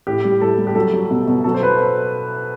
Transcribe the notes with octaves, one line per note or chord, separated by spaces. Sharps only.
A2 G4
G3
A2 A4
G3
G4
F#3 A4
F#3
B2
B2
F#3 A4
C5
B4